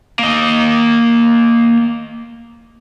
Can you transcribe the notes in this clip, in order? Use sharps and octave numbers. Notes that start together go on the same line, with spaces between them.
A#3 D#5